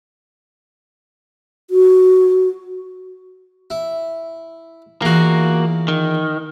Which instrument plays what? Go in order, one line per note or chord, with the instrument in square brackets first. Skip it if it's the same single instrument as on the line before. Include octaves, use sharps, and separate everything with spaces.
[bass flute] F#4
[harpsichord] E4
[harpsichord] E2 F4 [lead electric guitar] A#3 F#4
[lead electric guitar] D#3